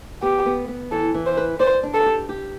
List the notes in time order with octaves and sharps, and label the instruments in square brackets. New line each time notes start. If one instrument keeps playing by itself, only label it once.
[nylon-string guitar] B3 [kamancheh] G4
[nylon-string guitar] B3
B3
[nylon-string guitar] E3 [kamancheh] A4
[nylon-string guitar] E3
[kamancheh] C5
[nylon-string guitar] B4
[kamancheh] C5 [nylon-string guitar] D5
[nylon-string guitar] D4
[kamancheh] A4
[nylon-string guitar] G4
G4